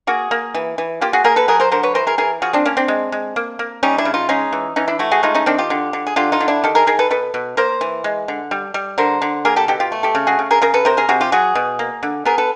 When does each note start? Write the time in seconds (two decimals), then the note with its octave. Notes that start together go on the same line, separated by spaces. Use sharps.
0.07 A#3 F#4 G#4
0.31 A#3
0.54 E3
0.78 E3
1.01 A#3 F4 G4
1.13 F#4 G#4
1.24 A#3 G#4 A#4
1.36 A4 B4
1.48 F#3 G#4 A#4
1.60 A#4 C5
1.72 D3 A#4 C5
1.83 B4 C#5
1.95 E3 A#4 C5
2.07 G#4 A#4
2.18 E3 G#4 A#4
2.42 F3 F#4 G#4
2.53 C4 D4
2.65 A#3 C#4
2.77 C4 D4
2.88 G#3
3.12 G#3
3.36 A#3
3.59 A#3
3.83 G3 C#4 D#4
3.98 D4 E4
4.05 C#3
4.14 D#4 F4
4.29 G#3 C#4 D#4
4.53 E3
4.76 E3 C#4 D#4
4.87 D4 E4
4.99 A3 E4 F#4
5.11 F#4 G#4
5.23 G#3 D#4 F4
5.35 C#4 D#4
5.46 D#3 C4 D4
5.58 F4 G4
5.70 D3
5.93 D3
6.07 G#4
6.16 D3 F4 G4
6.32 D#4 F4
6.40 D3
6.48 D4 E4
6.64 D#3 G4 A4
6.75 G#4 A#4
6.87 D#3 G#4 A#4
6.99 A4 B4
7.10 B2 A4 B4
7.34 B2
7.57 A#3 A#4 C5
7.81 E3
8.04 G#3
8.28 D3
8.51 G3
8.74 G3
8.98 D3 A#4 C5
9.22 D3
9.45 A#3 G#4 A#4
9.56 G4 A4
9.68 B2 G4 A4
9.80 F4 G4
9.92 A3
10.03 G4 A4
10.15 C#3
10.27 F#4 G#4
10.39 C#3
10.51 G#4 A#4
10.62 C#3 G#4 A#4
10.74 A4 B4
10.85 C3 A#4 C5
10.97 G#4 A#4
11.09 C3 F#4 G#4
11.21 F4 G4
11.32 F#3 F#4 G#4
11.55 B2
11.79 A#3
12.03 D3
12.25 B3 G#4 A#4
12.38 A4 B4